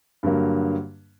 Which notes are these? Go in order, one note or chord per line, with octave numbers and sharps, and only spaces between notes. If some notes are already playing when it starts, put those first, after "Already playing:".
G2 D3 F#3 A#3